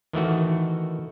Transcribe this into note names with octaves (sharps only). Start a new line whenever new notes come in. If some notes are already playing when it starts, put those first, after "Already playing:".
D#3 E3 A3 F#4